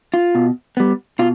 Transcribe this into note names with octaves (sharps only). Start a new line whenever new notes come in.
F4
B2
G3 B3
B2 F4